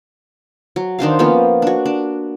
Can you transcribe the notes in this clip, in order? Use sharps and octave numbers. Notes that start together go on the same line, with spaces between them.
F#3
D#3 D4 C5 F5
F3 A#3 B3 C#4
D4 F#4
D4